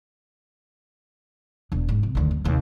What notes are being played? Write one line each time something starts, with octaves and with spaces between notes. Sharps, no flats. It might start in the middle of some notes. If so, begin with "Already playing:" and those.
E1 D4
G#2
C2
D2 D#3
F#2
D#2 C3